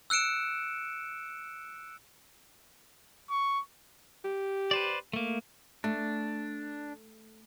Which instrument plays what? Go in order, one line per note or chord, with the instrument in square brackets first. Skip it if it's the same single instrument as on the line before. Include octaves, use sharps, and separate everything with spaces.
[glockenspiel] E6 F#6 C#7 D7 E7
[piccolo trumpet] C#6
[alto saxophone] G4
[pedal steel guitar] B4 C5 D5
A3 A#3
[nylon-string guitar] A3 [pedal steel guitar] D4